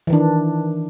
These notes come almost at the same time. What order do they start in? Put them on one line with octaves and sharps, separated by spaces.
E3 D#3 D4